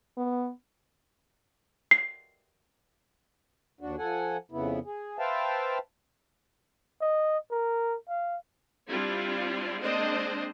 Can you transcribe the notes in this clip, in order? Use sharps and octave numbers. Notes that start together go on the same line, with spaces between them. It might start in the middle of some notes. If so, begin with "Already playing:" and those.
B3
C7
D#2 D4 F#4
F3 A4 F#5 G#5
F2 C#3 B3 E4
G#4
B4 C5 E5 F5 G5 A5
D#5
A#4
F5
G3 C4 D4 E4 F4
G#3 A#3 C4 D4 C5 D#5